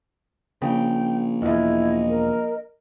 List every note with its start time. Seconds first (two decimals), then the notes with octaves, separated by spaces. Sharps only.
0.62 A#1 C#3 G5
1.42 E1 E2 E4 D#5
2.09 A#4